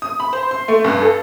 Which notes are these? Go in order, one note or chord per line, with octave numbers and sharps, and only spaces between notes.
D#6
B5
C5
C6
A3
G2
A4